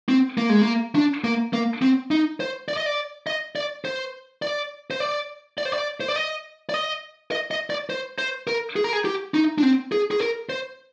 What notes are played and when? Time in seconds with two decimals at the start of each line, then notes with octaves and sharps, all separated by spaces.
0.09 C4
0.38 A#3
0.50 G#3
0.61 A#3
0.95 D4
1.24 A#3
1.53 A#3
1.82 C4
2.11 D#4
2.40 C5
2.68 D5
2.77 D#5
2.86 D5
3.27 D#5
3.56 D5
3.85 C5
4.42 D5
4.91 C5
5.00 D5
5.58 D5
5.65 C5
5.73 D5
6.01 C5
6.08 D5
6.16 D#5
6.69 D5
6.74 D#5
7.32 D#5
7.51 D#5
7.70 D5
7.90 C5
8.18 C5
8.47 A#4
8.76 G#4
8.84 A#4
8.93 G#4
9.05 G4
9.34 D#4
9.58 D4
9.63 C4
9.92 G#4
10.11 G#4
10.20 A#4
10.50 C5